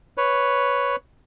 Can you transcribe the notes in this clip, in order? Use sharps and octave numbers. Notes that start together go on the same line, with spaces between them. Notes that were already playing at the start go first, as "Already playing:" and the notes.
B4 C#5